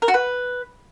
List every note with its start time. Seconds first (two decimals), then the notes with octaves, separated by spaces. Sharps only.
0.02 A#4
0.08 F#4
0.14 B4